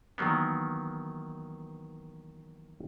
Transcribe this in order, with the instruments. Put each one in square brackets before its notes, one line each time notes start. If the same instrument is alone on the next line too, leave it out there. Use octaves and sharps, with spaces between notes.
[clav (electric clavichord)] D#3 E3 F#3 A#3 B3